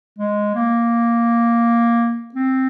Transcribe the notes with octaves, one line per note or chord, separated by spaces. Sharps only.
G#3
A#3
C4